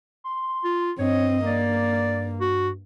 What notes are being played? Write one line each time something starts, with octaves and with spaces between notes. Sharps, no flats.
C6
F4
G2 C4 C#5 D#5
A#3 D5
F#4